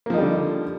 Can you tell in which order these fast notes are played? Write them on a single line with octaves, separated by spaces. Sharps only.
A#3 F3 D#4 G3 D3